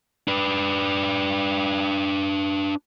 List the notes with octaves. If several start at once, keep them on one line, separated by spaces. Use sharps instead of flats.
D4 B4